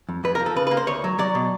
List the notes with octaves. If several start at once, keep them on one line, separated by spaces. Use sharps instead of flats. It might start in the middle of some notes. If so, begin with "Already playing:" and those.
F2
F2 B4
A#4
F3
A4
C#3 B4
B4
A#3
C5
D2 C#5
F#3
F#3 D5
B2